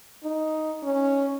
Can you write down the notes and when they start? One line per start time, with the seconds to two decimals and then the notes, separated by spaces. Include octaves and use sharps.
0.24 D#4
0.83 C#4